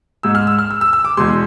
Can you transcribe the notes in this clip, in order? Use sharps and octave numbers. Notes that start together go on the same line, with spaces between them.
G#2 G#3 E6
F6
E6
F6
E6
E6
E6
D6
E2 B2 G#3 C6